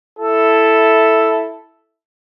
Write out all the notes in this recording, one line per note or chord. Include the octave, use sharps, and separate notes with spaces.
E4 A4